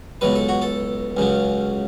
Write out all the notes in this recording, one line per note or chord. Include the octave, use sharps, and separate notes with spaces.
C#2 B2 F#3 B4
A4
F#4
A4
C#2 C#3 F#3